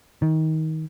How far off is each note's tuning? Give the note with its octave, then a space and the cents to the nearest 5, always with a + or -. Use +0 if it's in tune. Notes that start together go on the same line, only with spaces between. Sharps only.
D#3 +25